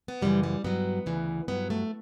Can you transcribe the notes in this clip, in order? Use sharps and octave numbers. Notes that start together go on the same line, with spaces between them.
B3
F#2 C#3 E3 G3
G3
G2 F#3 B3
D2 C#3 E3
G2 F#3 B3
A3